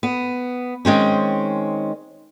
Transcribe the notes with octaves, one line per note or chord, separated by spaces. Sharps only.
B3
D#3 G#3 C4 C#4